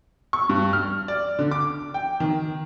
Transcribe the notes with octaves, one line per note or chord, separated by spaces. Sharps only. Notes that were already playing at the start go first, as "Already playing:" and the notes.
C#6
G2
F6
D5
D3
D6
G5
D#3